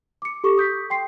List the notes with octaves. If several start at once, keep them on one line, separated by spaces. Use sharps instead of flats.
D6 C#7
G4 A4 C#6 D6
D#6 G6 B6
G5 C6 C7